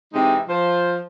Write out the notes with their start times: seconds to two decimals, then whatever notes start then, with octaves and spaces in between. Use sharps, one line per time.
0.14 C3 E3 G#3 C4 D#4
0.48 F3 C5